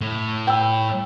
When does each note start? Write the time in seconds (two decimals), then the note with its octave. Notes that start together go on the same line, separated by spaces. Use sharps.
0.01 A2
0.47 G5 E6